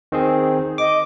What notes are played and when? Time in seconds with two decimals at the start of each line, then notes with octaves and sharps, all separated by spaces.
0.12 D#3 C4 G#4
0.78 D#5 D6